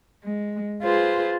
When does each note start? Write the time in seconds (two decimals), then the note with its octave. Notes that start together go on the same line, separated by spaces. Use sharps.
0.24 G#3
0.82 F4 G#4 B4 C5